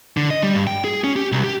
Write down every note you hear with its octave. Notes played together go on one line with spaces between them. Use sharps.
D3
D#5
G3
G2
G5
G#4
C#4
G4
C2
G4